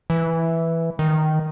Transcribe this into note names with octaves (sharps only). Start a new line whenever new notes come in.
E3
D#3